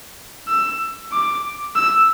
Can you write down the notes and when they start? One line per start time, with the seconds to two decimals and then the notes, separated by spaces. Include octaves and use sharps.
0.48 E6
1.12 D6
1.76 E6